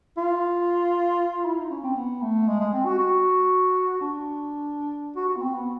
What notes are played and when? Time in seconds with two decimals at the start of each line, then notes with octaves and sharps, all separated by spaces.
0.17 F4
1.45 E4
1.58 D#4
1.71 C#4
1.84 C4
1.96 B3
2.22 A3
2.48 G#3
2.60 G#3
2.73 C4
2.86 F#4
2.99 F#4
4.01 D4
5.16 F#4
5.29 F#4
5.37 B3
5.42 C4
5.54 B3